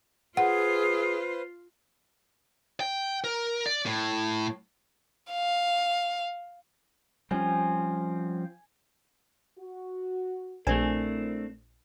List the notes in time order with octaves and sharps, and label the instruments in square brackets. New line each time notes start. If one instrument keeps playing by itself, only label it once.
[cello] F4 [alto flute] G#4 [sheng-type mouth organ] B4 C5 [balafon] F#5
[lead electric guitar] G5
A#4
D5
A2
[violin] F5
[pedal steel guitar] F3 C4 [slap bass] G3 C#4 [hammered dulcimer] G#5
[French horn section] F#4
[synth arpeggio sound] A#1 G#5 [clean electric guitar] A3 C4 D4 [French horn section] E4 A#4 C5